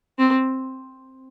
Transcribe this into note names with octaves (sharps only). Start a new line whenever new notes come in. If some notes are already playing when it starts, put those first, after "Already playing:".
C4